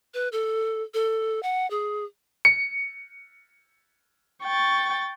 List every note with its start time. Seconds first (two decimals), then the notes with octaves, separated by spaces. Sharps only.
0.14 B4
0.32 A4
0.94 A4
1.43 F#5
1.70 G#4
2.45 C#7
4.43 G5 C#6 A6